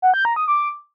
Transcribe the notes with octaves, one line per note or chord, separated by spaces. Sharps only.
F#5
G6
A#5
D#6
D6